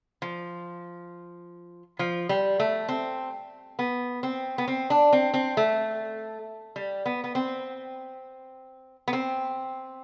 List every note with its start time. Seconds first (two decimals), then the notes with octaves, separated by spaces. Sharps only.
0.22 F3
1.99 F3
2.29 G3
2.60 A3
2.89 C4
3.79 B3
4.23 C4
4.58 B3
4.68 C4
4.90 D4
5.13 C4
5.34 C4
5.57 A3
6.76 G3
7.06 B3
7.24 B3
7.35 C4
9.08 B3
9.13 C4